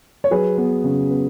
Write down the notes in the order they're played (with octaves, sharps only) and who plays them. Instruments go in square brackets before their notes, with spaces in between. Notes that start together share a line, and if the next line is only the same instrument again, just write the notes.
[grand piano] C#5
F#3 G#4 B4
B3
C#3
B3